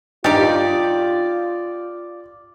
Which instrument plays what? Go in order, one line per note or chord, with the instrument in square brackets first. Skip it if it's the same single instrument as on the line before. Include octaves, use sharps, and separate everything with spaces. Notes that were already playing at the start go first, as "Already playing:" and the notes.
[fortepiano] G2 D#4 G4 [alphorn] F4 [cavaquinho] D5 D6